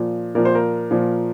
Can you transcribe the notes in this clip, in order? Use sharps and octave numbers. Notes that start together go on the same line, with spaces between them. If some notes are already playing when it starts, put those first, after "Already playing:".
Already playing: A#2 F3
A#2 F3 A#4
C5
A#4
A#2 F3